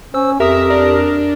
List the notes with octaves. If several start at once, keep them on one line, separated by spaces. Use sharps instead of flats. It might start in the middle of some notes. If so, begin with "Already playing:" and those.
C#4 C5 E6
F2 G4 A#4 E5 D#6
D4 A#4